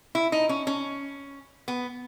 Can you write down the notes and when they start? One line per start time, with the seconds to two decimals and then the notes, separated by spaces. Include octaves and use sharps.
0.15 E4
0.32 D#4
0.49 C#4
0.67 C#4
1.68 B3